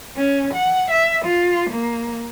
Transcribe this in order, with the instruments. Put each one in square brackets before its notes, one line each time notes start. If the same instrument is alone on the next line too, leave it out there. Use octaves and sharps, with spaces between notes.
[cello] C#4
F#5
E5
F4
A#3